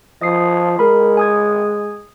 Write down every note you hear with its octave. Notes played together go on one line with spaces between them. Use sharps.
F3 D#5 D#6 C7
G#3 A#4 B5
G#5 D#6 G#6